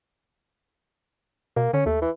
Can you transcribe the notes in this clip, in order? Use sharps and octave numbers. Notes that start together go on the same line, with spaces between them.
B2 A#3
D3 C#4
D#2 A3
E3